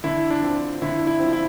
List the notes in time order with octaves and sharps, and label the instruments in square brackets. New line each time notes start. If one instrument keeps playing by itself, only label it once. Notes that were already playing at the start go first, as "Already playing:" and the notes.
[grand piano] D3 [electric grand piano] E4
[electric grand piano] D4
[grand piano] F3 C4
[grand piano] D3 [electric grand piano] E4
[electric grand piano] E4
[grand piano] F3 C4
[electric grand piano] E4